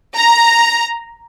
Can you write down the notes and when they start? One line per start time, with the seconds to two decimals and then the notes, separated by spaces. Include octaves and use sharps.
0.15 A#5